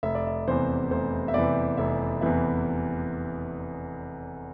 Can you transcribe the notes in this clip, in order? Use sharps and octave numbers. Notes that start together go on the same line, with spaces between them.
F1 E5
D5
E5
E2 C3 E3 C5
F1 C5
E5
E2 C3 E3 D5
F1 E5
E2 C3 E3 E5